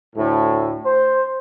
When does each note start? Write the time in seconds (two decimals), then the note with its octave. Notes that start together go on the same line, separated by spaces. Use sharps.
0.16 D2 A2
0.86 C5